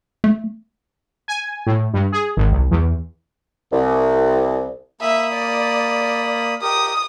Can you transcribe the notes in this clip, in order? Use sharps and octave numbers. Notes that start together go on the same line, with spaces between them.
A3
G#5
A2
G2
G#4
G#1
C2
E2
C2
A#3 E5 B5 D#6
D5
D5
G4 A#4 D#6